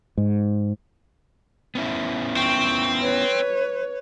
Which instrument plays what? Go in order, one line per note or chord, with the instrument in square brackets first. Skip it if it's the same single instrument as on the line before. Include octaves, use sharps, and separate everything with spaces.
[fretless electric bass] G#2
[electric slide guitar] B3 C#4 E4
[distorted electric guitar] C4 [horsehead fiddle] G5 [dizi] C#6
[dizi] B4 [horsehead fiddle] C#5